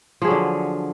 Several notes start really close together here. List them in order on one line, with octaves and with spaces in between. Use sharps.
F3 G#4 F#3 D3